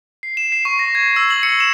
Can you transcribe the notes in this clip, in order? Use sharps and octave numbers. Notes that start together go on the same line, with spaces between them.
C7
E7
C7
C#6
A#6
G#6
E6
F#7
C#7
E7